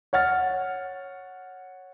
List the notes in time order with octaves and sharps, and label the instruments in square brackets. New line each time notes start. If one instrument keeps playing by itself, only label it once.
[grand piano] C#5 F#5 F6 A6